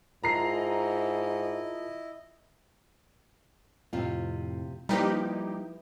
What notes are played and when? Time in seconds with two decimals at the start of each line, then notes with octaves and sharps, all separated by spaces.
0.23 G#2 E4 F4 A#4 D#5 A5 A#5 C7
3.93 F2 A2 C3 F4
4.89 F3 G3 A#3 D#4 E4 G4 B4